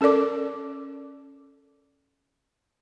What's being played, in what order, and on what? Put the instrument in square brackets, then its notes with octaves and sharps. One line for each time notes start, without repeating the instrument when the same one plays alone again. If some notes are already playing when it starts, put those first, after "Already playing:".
[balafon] C#4 A4 A#4 D5 D6